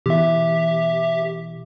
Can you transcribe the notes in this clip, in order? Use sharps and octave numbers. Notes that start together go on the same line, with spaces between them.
B2 E3 G4 E5